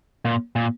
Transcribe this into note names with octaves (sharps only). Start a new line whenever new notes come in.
A#2
A#2